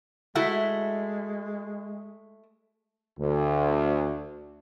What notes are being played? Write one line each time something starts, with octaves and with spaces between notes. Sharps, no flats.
G#3 A3 E4 F#4
D2